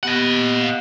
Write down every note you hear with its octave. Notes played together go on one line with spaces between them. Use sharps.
B3 G4 D#5 F#5
F5